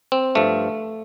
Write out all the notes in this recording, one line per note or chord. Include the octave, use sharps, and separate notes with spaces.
C4
G2 F3 A3